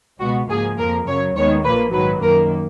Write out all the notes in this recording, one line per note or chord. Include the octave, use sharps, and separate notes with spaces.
C#2 B2 G#3 B3 F#4
G#2 F3 A#3 G#4
F2 F3 A#3 A#4
F#2 C#3 F#3 C#5
D#2 D#3 G#3 B3 C#5
A#1 A#2 F3 A#3 B4
G#2 D#3 F#3 B4
F#2 D#3 A#3 A#4